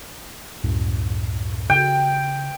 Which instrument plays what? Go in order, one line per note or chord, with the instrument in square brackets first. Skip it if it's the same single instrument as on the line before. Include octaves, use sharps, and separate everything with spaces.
[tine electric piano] C#2 F#2 A2
[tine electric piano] C#3 [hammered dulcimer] G5